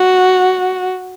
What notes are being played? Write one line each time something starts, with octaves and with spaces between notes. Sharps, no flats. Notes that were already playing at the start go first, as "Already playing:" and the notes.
Already playing: F#4